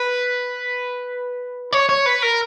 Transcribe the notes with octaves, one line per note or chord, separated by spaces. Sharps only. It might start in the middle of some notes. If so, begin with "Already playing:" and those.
Already playing: B4
C#5
C#5
B4
A#4